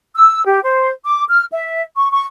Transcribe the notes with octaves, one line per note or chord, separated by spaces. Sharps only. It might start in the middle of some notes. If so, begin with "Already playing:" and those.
E6
G4
C5
D6
F6
E5
C#6
C#6